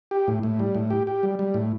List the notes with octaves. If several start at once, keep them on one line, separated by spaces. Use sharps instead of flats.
G4
A2
A2
G3
A2
G4
G4
G3
G3
A2